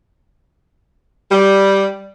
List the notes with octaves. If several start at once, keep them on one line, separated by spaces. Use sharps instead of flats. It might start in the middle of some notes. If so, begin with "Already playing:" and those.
G3